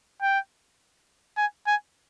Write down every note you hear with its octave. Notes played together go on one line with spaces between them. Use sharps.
G5
G#5
G#5